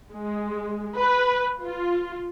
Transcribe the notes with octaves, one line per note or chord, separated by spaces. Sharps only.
G#3
B4
F4